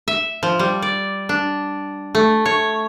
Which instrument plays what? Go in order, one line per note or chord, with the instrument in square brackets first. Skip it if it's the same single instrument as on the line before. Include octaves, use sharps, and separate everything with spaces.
[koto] E5
F3
G3
D5
D4
A3
C#5